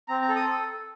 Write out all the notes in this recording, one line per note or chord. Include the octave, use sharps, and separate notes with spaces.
C4 A#5
A#5
A4
D#6